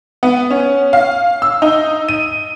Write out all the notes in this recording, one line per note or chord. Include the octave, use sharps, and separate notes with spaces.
B3
C#4
F5
E6
D#4
D#7